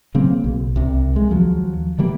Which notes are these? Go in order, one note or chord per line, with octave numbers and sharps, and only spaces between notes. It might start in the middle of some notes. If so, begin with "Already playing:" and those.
C#3 F#3 A#3 C4
B1
C2 C3
G#3
D#2 F3 F#3
D3 E3 G3 A#3